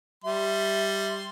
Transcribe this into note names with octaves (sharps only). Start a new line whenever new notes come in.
G3 E5 C6